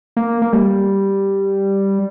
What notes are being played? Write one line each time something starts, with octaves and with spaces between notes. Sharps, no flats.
A#3
A#3
G3